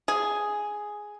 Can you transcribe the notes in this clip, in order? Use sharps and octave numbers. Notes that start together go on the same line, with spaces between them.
G#4